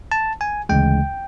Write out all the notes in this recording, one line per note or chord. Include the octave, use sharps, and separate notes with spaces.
A5
G#5
D2 C#3 E3 G#3 G5